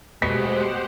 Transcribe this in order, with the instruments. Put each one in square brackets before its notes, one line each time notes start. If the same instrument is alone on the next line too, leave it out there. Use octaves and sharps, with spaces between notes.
[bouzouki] B2 [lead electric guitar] G#3 A3 [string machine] G4 C5 F#5 [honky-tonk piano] B6